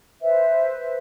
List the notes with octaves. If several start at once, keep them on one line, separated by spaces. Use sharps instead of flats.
B4 C5 E5